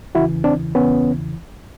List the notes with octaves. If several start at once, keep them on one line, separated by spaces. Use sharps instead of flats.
E2 C#3 E3 E4 F#4
C4 D4
E2 C#3 E3 B3 C#4